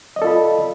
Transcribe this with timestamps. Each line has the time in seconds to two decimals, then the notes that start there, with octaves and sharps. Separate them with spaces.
0.16 D#5
0.19 D5
0.22 A4
0.24 F4
0.27 B5